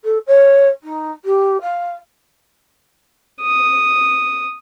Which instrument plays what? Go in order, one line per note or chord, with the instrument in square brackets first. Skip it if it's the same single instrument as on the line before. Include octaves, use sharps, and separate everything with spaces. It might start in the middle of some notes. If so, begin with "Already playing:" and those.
[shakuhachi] A4
C#5
D#4
G4
F5
[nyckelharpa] D#6